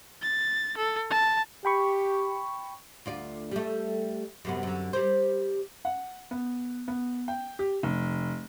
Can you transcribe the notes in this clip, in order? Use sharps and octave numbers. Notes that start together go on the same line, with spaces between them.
A6
A4
A5
G4 G5 B5 C#6
D2 F4 D5
G3 A3
F#2 C3 B3
F#2 D3
G3 A#4 C5
F#5
B3
B3
G5
G4
F1